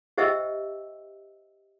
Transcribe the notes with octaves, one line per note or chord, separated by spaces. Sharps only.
G4 C5 D#5 E5 G5 E6